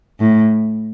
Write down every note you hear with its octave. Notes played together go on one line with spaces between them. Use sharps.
A2